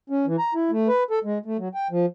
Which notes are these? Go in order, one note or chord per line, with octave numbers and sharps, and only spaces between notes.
C#4
E3
A#5
E4
A3
B4
A4
G#3
A3
F#3
G5
F3